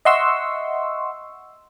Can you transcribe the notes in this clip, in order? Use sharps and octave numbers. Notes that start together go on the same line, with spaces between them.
D#5 E5 F#5 C6 C#6 E6